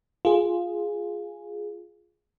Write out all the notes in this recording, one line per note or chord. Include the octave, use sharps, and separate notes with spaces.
F4 G#4